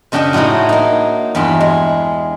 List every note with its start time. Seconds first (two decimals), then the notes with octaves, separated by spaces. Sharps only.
0.12 F#2 C#3 D4 G4 D#5 G5
0.33 A2 F#3 G#3 A3 D#4
0.69 A#3 D#4
1.35 E2 G2 F#3 B5 C6
1.60 G#3